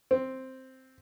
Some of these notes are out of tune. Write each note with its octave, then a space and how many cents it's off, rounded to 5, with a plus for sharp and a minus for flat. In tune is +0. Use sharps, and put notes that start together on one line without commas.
C4 +0